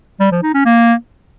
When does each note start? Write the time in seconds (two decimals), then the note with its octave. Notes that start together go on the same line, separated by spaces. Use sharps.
0.20 G3
0.31 F3
0.43 D#4
0.54 C#4
0.65 A#3